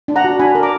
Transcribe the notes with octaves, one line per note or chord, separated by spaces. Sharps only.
D4
F#5 A#5
F#4
D4 G#5 B5
A#4
A#5 D6